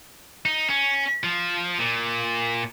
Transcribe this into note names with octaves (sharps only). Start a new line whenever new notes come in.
D#4
C#4
F3
A#2